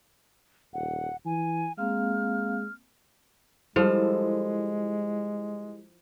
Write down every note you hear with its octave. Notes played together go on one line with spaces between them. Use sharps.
D#1 F#5
E3 G#5
G#3 A#3 C4 F5 F6
F3 G3 G#3 E4 A4 C5